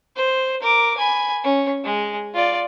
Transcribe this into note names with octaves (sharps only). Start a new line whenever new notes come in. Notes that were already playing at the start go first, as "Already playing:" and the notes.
C5
A#4 D6
G#5 B5
C#4
G#3
F4 D5